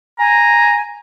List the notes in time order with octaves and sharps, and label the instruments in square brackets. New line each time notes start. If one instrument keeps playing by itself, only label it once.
[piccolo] G#5 [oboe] A#5